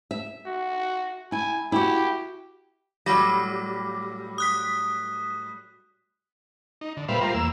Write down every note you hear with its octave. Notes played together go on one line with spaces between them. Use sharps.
E5
F#4
E4 G#5
E4 F#4 G4
A2 F#3 G3 B5 D6 A#6
D#6 F#6 B6
D#4
D3
A#2 G3 B4 C5 E5 F5
G3 F4 A#4 C5
E2 A#3 E6